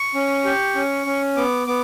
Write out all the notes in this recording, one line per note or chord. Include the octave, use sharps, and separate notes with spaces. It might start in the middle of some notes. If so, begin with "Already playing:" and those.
Already playing: C#6
C#4
G4
C#4
C#4
B3 D6
B3 D6